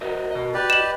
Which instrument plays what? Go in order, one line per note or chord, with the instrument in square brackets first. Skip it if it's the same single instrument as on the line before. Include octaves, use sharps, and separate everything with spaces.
[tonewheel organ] F#4 A#4 [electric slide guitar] C5 D#5 E5
[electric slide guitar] B2 D#5
[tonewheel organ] F#4 [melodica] G4 B4 D5
[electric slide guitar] D#5 [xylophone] E7 F#7